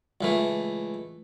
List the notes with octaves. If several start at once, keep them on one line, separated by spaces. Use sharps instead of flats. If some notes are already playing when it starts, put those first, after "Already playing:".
C#2 E3 A3